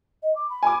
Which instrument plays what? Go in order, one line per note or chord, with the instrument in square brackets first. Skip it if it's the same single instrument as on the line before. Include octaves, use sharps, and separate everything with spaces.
[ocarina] D#5
D6
B5
[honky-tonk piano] G#5 D6